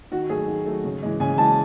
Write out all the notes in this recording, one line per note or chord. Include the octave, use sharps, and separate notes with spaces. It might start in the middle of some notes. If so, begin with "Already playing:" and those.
D#3 F#4
F#3 A3 G#4
D#3
F#3 A3
C#3
E3 G#3
C#3 G#5
E3 G#3 A5